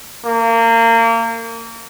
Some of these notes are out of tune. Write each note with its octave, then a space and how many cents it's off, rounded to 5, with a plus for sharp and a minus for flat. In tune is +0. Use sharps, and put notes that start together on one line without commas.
A#3 -30